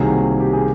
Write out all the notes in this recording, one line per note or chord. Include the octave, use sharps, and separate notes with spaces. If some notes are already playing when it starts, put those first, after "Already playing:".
Already playing: C2 C3 D#3 F#3 A#3 G#4
G4
G#4